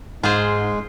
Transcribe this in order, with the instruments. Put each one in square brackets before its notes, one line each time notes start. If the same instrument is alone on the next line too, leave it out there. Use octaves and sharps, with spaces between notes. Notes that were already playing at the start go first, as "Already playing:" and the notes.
[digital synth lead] G#2 [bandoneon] G#3 [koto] F4 G#4 C5